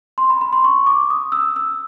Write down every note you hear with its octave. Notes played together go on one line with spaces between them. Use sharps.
C6
B5
B5
C6
C#6
D6
D#6
E6
E6